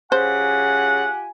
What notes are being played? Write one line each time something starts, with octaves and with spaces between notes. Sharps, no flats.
C#3 F4 G4 C5 F#5 G#5